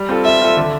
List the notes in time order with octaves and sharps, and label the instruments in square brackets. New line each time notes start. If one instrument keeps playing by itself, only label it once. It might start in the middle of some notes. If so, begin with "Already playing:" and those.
Already playing: [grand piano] G3
C4 F4 A4
[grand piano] G3 [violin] E5
[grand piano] C4 F4 A4
D3